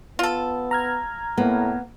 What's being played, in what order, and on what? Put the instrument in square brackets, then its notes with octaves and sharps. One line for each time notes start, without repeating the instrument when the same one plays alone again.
[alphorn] B3 [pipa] F4 A4
[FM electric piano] A#5 F6 G#6
[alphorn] A2 [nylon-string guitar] A#3 B3